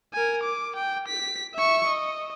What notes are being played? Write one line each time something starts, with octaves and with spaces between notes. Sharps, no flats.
A#4 G#5
D6
G5
B6
E5 C#6
D#5